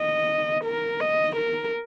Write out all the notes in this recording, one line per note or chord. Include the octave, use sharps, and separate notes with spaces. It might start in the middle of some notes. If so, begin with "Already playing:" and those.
Already playing: D#5
A#4
D#5
A#4